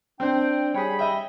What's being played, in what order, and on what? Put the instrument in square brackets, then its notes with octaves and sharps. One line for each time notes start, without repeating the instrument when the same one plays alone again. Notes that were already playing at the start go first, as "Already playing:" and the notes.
[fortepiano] C4 C5 [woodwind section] D4 G5
[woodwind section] G3 B5 [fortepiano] G#4 C#5
[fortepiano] D#5 E5 G5